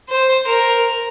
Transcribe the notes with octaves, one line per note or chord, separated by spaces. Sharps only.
C5
A#4